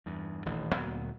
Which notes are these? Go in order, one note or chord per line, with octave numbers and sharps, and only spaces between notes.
E2 G2
D#1 A1 D#3
D2 A#2 F#3 B3